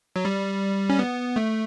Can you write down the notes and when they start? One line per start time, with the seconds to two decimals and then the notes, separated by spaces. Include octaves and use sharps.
0.16 F#3
0.25 G3
0.90 C#4
0.99 B3
1.36 A3